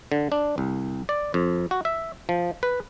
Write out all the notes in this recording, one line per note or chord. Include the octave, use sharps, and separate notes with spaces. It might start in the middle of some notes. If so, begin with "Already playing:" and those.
D3
D4
C2
D5
F2
F#4
E5
F3
B4